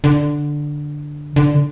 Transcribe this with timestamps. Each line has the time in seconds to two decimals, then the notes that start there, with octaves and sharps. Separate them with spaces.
0.04 D3
1.36 D3